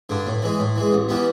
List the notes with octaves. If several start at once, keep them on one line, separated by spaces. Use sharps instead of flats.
G2 D3
A2
E3 G#3
A2
E3 G#3
A1
E3 G3 B3